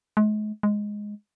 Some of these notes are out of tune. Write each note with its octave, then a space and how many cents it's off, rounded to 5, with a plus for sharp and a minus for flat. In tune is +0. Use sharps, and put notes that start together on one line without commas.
G#3 +40
G#3 +0